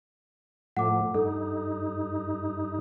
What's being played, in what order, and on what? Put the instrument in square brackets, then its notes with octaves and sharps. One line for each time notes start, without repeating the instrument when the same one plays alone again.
[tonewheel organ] A2 F3 A3 [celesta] F#5 D6
[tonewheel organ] G2 D#4 [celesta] A4